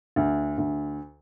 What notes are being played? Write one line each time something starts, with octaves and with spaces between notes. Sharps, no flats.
D2
D2